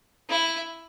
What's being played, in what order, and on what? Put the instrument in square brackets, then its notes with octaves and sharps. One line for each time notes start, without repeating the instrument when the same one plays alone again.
[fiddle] E4